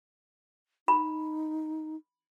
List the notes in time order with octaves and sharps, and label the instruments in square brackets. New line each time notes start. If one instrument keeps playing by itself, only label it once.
[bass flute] D#4 [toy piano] B5